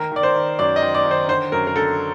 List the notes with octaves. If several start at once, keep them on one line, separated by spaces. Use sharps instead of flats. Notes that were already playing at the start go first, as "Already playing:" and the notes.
Already playing: D#3 A#4
D#3 D5
C5
D#3
F#2 D5
D#5
D#3
D5
D#3
C5
D3 C5
F#2 A#4
A#4
D3 A4